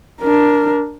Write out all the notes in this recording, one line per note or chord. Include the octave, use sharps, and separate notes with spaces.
D4 A#4